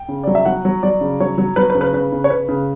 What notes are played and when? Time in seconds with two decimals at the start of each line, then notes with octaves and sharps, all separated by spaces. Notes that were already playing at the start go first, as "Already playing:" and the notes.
Already playing: G5
0.08 C#3
0.23 F#3 D5
0.35 E5
0.46 F#3 F#5
0.65 F#3
0.83 F#3 D5
1.01 C#3
1.20 F#3 C#5
1.38 F#3
1.56 F#3 B4
1.70 B4
1.75 C#3
1.81 B4
1.93 C#3 B4
2.12 C#3
2.24 C#5
2.30 C#3 B4
2.49 C#3